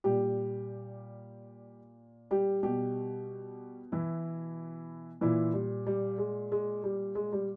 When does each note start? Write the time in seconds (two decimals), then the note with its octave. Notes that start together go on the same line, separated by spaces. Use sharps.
0.04 A#2 G3 G4
2.31 G3 G4
2.63 B2 G3 G4
3.92 E3 E4
5.21 A#2 E3 E4
5.54 G3
5.87 G3
6.18 G#3
6.52 G#3
6.84 G3
7.15 G#3
7.33 G3